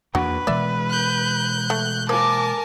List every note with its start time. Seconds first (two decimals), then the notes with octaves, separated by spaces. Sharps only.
0.15 E2 A#3 D4 F#4 B4
0.47 B2 E3 G#3 D5 E5
0.88 F#6 G6
1.70 A3
2.09 F3 A#3 A#4 G#5 A5 D6